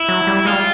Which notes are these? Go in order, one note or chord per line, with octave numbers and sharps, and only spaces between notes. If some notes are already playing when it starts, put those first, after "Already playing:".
Already playing: E4
F#3
G3
G#3 F4
G3